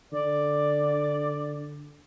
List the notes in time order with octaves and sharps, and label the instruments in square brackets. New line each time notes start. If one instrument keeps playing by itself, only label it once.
[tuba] D3 [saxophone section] D5